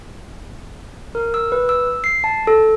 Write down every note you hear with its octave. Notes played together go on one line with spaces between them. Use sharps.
A#4
E6
B4
E6
C7
A5
A4